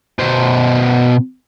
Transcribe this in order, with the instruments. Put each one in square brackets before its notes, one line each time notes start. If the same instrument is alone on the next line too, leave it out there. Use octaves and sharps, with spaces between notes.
[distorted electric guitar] B2 C5